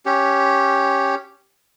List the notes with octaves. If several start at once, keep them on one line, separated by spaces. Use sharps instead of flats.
C#4 G4